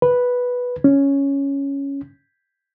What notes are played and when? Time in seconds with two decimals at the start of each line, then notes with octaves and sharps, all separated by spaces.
0.02 B4
0.84 C#4